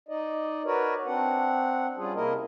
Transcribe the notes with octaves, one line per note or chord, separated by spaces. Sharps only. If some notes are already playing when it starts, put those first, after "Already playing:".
D#4 D5 D#5
F#4 A#4 B4 C#5 D5
C4 D4 F#5
G3 C#4 F4 G#4
C3 A#3 E4 A#4 D#5